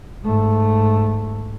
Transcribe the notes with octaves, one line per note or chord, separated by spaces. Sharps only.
G#2 A3